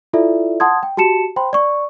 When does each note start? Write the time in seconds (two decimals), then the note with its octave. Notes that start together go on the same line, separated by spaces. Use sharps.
0.13 E4 F4 A4 D5 E5
0.60 F#5 A5 C6 D#6 G#6
0.83 G5
0.97 F#4 G4 A5 C#7 E7
1.36 C5 G5 B5 C6
1.53 D5 C#6